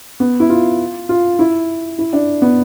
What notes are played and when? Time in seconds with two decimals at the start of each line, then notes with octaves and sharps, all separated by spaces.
0.20 B3
0.40 E4
0.50 F4
1.09 F4
1.39 E4
1.98 E4
2.13 D4
2.42 B3